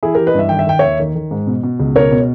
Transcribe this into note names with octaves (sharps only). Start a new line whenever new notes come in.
E3 E4 G#4
E3 G4 A#4
B4 D#5
G2 E5
D#3 G5
E5
D#3 G5
D#2 C#5 E5
D#3
D#3
G#2
B2
B2
C#2
B2 A#4 C#5
B2